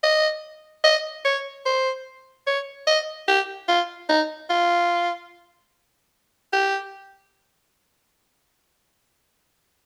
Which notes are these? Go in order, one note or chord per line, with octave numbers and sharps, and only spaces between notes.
D#5
D#5
C#5
C5
C#5
D#5
G4
F4
D#4
F4
G4